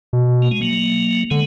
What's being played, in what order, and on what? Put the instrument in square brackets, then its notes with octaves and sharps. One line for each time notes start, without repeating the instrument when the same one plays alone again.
[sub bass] B2
[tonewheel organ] A#3
G#3
F#3 A#3
[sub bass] D3 [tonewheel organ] G#3 B3